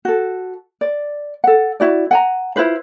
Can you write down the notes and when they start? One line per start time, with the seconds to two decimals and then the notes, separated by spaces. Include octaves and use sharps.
0.05 F#4 A4
0.81 D5
1.44 A4 F#5
1.80 E4 F#4 D5
2.11 F#5 G#5 A#5
2.56 E4 F4 B4 C5